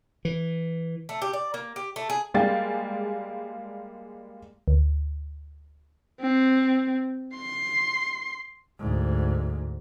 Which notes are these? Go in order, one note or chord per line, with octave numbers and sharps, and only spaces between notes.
E3
A3
G4
D5
A#3
G4
A3
G#4
G3 G#3 A#3 G#4 G5 A6
D2
C4
C6
D2 G#2